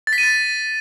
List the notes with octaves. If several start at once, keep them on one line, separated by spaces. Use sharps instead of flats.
A6
B6
D#7
A6